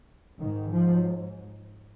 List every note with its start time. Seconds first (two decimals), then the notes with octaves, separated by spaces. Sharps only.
0.41 G#2 D#3
0.71 F3